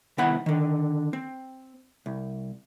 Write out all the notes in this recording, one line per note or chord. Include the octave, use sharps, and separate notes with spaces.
C2 D#3 B3 E4 F#5 B5
D3 D#3
C4
C2